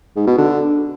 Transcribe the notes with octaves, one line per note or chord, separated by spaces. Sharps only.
G#2
B2
D3